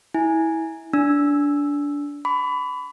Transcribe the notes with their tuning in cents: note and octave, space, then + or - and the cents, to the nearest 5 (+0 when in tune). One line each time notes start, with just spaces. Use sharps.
E4 -25 G#5 +0
D4 -20 E6 +0
B5 +25 D6 -45